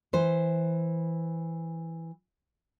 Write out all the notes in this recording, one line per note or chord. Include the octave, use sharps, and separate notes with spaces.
E3 C5